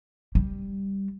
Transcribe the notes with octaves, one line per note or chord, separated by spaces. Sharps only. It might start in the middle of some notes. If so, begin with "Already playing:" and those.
G3